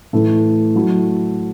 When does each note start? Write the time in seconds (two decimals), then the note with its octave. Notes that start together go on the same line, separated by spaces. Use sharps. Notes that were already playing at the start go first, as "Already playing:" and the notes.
0.13 A2 E3 A3
0.76 F#3 A3 E4